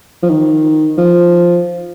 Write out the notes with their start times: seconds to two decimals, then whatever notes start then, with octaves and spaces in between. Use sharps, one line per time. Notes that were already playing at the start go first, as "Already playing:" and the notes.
0.23 F3
0.29 D#3
0.98 F3